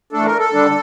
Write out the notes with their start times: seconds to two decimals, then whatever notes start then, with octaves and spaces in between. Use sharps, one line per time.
0.12 E3 A3 D4 A4
0.25 A#4
0.39 A4
0.53 D3 G3 D4